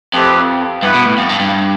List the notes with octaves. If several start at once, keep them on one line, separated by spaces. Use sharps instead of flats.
F2 A3 C4 G4 B4
G2 B3 E4 B4
B2
A2
F2
G2
G2